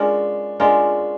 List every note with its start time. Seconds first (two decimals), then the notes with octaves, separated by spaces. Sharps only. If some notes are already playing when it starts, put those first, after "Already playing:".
Already playing: G#3 C#4 D4 F4 A#4
0.60 G#3 C#4 D4 F4 A#4